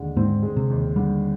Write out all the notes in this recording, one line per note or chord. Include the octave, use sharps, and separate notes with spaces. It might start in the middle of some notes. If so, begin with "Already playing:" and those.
Already playing: D#2 D3 G#3
G#2 C4
G#3
C3
D#2
D3 G3